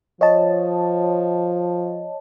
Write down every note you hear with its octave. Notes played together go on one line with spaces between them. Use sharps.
F3 C#5 D#5 A5